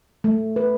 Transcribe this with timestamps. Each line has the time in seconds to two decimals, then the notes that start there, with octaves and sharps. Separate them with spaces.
0.24 A3
0.56 B4